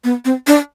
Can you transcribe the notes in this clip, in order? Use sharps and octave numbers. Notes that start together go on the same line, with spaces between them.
B3
C4
D4